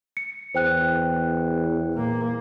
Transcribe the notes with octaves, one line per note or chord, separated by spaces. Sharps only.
C#7
E2 C5 G5 F#6
A#2 A#3